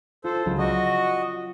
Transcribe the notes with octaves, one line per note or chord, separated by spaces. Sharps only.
F4 A4 C5
C#2 F#3 F4
F#4 D5 D#5